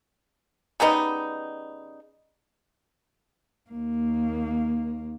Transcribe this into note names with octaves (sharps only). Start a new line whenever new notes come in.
C#3 G3 B3 D#4
D#2 A#3